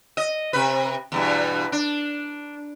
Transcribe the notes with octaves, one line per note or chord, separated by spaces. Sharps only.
D#5
C3 B4
E2 G2 B2
D4